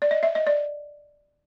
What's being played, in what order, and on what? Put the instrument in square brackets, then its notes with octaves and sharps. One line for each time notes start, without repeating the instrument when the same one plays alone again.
[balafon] D5
D#5
E5
D#5
D5